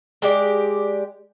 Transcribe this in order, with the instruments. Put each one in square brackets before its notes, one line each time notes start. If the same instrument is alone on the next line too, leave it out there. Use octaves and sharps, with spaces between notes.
[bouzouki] G#3 G4 D5